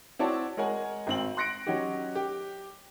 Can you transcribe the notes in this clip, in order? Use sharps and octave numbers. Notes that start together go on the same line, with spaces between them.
C4 E4 F#4 C#5 D5 A5
G#3 A#4 C#5 F#5 G#5
G#1 C4 F#7
C6 F#6 A#6 C#7 D7
F#3 C#4 D#4 F#4 G4
G4